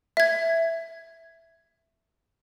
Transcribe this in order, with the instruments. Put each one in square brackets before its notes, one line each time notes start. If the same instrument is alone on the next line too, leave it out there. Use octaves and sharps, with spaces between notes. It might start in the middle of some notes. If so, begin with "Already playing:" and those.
[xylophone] E5 G#6